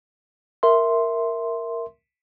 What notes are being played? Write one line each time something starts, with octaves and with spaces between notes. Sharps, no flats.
A#4 E5 C6